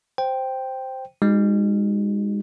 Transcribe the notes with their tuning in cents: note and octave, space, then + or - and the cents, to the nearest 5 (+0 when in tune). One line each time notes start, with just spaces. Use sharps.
C5 +0 G5 +0
G#3 -30 D#4 +0 F#4 +0